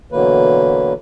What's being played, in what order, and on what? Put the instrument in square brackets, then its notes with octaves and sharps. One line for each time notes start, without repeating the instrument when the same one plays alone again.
[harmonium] B2 D3 E3 F#3 A#3 B4